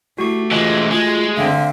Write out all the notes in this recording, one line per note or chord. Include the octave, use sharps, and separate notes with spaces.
A3 E4 F#4 G4 C#6
E3 G#3 F4
G#3 F4
D3 C4 E5 F5 G5